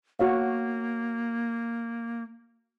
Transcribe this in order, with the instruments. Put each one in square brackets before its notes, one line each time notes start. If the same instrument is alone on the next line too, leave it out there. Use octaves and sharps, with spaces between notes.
[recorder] A#3 [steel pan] F#4 C#5 F5